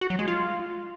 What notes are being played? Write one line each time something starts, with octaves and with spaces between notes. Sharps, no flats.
F#4
F#3
G#3
F4